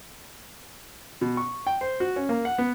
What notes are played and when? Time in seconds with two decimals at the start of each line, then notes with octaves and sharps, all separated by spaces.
1.21 B2
1.37 C#6
1.67 G5
1.81 C5
2.00 F#4
2.16 C#4
2.29 A#3
2.45 F#5
2.58 B3